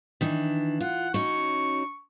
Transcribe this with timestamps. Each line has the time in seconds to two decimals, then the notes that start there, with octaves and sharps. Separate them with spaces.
0.21 D#3 E3 D4
0.80 F4 F#5
1.14 C#4 D#4 F#4 C#6